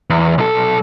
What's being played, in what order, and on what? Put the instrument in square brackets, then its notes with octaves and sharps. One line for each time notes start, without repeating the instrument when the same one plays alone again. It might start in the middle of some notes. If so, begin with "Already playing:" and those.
[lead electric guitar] E2
B1 A4